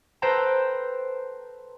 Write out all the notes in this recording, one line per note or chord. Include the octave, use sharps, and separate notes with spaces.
A4 B4 C5 G5 A5 A#5